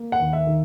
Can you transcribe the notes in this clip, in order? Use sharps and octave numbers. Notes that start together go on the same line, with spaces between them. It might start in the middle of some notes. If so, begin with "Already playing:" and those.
Already playing: A#3
F#5
D#2
E5
D#3